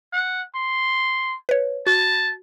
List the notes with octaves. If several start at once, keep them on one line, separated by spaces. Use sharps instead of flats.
F#5
C6
B4 C#5
F#4 A5